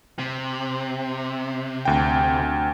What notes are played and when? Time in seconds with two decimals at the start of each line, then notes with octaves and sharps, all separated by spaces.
0.19 C3
1.85 D2 G5